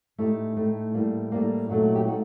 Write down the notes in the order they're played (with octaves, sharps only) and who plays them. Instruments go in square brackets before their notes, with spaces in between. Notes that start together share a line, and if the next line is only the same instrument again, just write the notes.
[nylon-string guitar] A2 A3 D#4 G4
A2 A3 D#4
A2 G3 A#3
A2 G3 A#3
A#2 F#3 A3 D#4 F#4
F#4
G4
A3 D#4 F#4